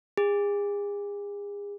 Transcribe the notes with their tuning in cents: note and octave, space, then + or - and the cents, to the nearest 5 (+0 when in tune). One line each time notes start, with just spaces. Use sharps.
G#4 -35